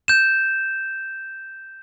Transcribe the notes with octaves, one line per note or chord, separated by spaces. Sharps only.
G6 E7